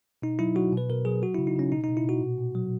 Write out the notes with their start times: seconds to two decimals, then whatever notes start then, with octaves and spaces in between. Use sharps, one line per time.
0.22 B2 D#4
0.39 F#3 E4
0.55 F#3 F#4
0.73 B2 B4
0.89 B2 A#4
1.05 F#3 G#4
1.22 F#3 F#4
1.34 C#3 E4
1.47 D#4
1.56 C#3 C#4
1.72 B2 D#4
1.84 B2 D#4
1.97 E4
2.04 B2 F#4
2.21 A#2
2.38 A#2
2.55 F#3